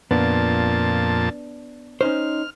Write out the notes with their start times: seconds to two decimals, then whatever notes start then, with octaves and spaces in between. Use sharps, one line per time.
0.11 F2 A#2 B3 D4 A5
2.01 C#4 D#4 C5 F6